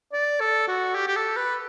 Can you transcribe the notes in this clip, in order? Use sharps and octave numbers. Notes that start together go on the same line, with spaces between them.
D5
A4
F#4
G4
G4
A4
B4